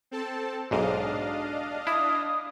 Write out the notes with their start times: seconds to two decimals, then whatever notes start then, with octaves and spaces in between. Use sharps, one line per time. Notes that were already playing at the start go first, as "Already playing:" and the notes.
0.11 C4 A4 A5
0.71 B1 G#2 D4 D#5 F5
1.87 E4 D#6